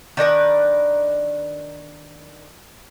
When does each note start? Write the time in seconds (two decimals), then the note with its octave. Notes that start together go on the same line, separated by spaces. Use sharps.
0.17 D#3 D4 A#4 B4